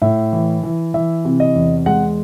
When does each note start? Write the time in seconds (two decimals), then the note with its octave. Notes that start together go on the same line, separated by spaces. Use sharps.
0.02 A2 E5
0.33 E3
0.63 E3
0.94 E3 E5
1.25 C3
1.40 D#5
1.55 E2
1.86 G#3 F#5